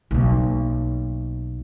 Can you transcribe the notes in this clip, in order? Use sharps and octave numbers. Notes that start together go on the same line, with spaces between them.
B1 A#3